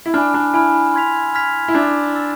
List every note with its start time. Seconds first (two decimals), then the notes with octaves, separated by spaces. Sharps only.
0.06 E4
0.14 D4 G#5 B5 F6
0.34 D4
0.54 E4 G#5 B5 F6
0.94 C6 F6 G#6 B6 F7
1.35 C6 F6 G#6 B6 F7
1.68 E4
1.74 D4 E6 A6 E7
2.15 E6 A6 E7